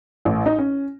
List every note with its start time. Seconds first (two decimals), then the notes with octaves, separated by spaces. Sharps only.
0.25 A1
0.46 D#4
0.58 C#4